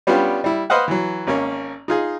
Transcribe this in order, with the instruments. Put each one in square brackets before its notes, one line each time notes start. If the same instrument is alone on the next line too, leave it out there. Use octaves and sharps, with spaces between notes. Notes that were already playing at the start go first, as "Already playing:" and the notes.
[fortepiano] G3 B3 C#4 D4 F4 G4
G3 E4
B4 C5 D#5 F5 F#5
E3 F#3
G#1 A#3 C#4
D#4 F4 G#4